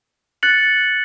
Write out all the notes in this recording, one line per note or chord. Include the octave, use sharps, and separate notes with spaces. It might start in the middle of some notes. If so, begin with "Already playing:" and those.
F#6 A6 C#7 F#7